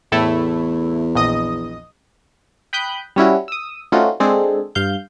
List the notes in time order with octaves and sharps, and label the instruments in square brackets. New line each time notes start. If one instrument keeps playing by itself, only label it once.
[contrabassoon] E2 [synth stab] A2 A3 E4
[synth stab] A#1 D#5 D#6
[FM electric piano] G5 B5 D#6 F#6 G6
G3 C#4 E4 F#4
D#6 E6
A3 C4 C#4 D#4 F4 F#4
G#3 C4 D4 G#4 A4
G2 F5 G6